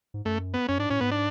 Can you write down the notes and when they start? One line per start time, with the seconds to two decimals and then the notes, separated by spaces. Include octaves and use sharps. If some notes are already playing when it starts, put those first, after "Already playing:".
0.14 G#2
0.25 F#2 A3
0.54 B3
0.68 F#2 C#4
0.79 G#2 D4
0.90 A2 C#4
1.01 G#2 B3
1.11 D4